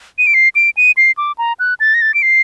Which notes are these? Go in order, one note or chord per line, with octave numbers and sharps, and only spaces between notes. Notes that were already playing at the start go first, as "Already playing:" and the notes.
D#7
D7
C7
D7
D#7
C7
D6
A#5
F#6
A6
A#6
A6
D7
C7